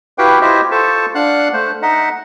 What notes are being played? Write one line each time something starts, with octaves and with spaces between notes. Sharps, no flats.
E4 F#4 G4 B4 F5 G5
E4 F4 G4 C5 D#5 E5
F4 A4 C5 A5 C#6
D4 F5 F#5 F#6
A3 C5
D#4 D#5 E5 F#5